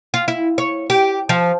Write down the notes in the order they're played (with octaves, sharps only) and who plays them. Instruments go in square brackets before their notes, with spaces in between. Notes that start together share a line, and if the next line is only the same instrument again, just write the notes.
[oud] F4
E4
C#5
G4
F3